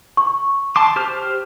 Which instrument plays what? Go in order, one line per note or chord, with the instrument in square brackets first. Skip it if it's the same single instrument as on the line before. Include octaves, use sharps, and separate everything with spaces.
[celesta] C#6
[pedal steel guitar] A5 C6 D6
G4 C5 F6